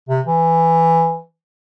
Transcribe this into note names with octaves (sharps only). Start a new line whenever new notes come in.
C3
E3